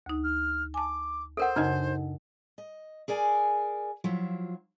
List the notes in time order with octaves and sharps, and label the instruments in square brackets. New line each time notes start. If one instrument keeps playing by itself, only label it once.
[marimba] D2 D#4
[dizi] F6
[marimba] G#5 A5 [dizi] D6
[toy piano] A4 A#4 F#5 [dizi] C5
[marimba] F#2 C#3 [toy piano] D4 D#4 D#5
[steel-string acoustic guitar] D#5
G#4 A#4 D5 G#5
F3 F#3 E4 F4